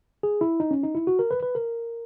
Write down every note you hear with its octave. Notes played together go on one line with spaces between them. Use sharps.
G#4
E4
D#4
C#4
D#4
E4
F#4
A#4
B4
B4
A#4